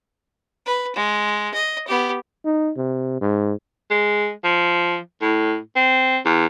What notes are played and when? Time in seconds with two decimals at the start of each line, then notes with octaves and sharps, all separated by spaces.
0.66 B4
0.95 G#3
1.54 D#5
1.87 B3 G4
2.45 D#4
2.77 C3
3.21 G#2
3.90 G#3
4.44 F3
5.22 A2
5.76 C4
6.25 E2